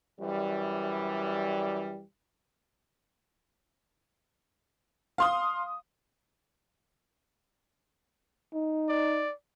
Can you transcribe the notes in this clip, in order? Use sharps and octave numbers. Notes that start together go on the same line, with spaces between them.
F#2 E3 G3
F5 C6 D#6
D#4
D5